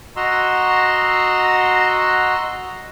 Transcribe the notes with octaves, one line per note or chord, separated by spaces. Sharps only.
F#4 D#5 A#5 C6 E6